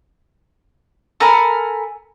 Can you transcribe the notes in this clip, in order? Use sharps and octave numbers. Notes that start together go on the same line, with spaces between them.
A4 A#4 G#5 B5